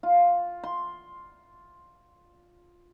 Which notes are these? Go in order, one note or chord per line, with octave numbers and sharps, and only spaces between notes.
F4
C6